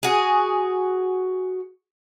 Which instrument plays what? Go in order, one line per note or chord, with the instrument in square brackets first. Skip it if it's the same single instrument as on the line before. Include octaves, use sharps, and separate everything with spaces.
[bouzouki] F#4 G#4